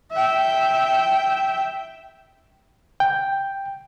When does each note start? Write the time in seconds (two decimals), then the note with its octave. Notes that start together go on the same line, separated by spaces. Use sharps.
0.12 E5 G5
3.00 G5